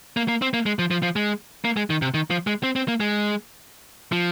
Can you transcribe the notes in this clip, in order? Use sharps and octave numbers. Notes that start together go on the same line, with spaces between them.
A#3
A#3
C4
A#3
G#3
F3
F3
F3
G#3
A#3
G#3
D#3
C3
D#3
F3
G#3
C4
C4
A#3
G#3
F3